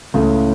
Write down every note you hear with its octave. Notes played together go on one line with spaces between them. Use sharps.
C#2 A2 C#3 A3